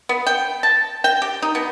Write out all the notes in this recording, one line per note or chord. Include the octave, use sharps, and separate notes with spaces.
B3
G5
A5
G5
G4
D#4
B2